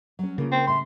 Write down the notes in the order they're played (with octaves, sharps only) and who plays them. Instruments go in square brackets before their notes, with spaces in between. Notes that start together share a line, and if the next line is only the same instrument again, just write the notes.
[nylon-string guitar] F#3 C#4
[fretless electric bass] C#3 [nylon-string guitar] A#3 F4 A#4
[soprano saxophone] C4
[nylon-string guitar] A2 E5 [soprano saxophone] C6